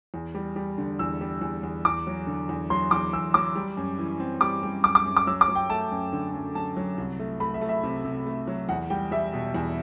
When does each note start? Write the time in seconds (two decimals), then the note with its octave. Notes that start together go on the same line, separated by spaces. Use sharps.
0.14 E2
0.35 G3
0.56 G3
0.78 D3
0.99 E2 E6
1.21 G3
1.41 E2
1.63 E2
1.85 E2 D6
2.07 F#3
2.27 D3
2.49 E2
2.70 F#3 C6
2.91 E2 D6
3.13 E2 E6
3.34 F#3 D6
3.56 G3
3.77 F#2
3.98 E3
4.20 C4
4.41 G3 D6
4.63 G3
4.84 F#2 D6
4.95 D6
5.06 F#2
5.17 D6
5.27 F#3 E6
5.41 D6
5.48 F#3
5.55 G5
5.70 A3 A5
5.92 F#2
6.12 D3
6.34 F#2
6.55 F#2 A5
6.77 F#3
6.98 C2
7.19 A3
7.40 A3 B5
7.54 E5
7.61 A3
7.69 E5
7.83 C3
8.05 C3
8.26 A3
8.47 F#3
8.69 E2 F#5
8.90 G3 G5
9.11 G3 E5
9.33 B2
9.54 E2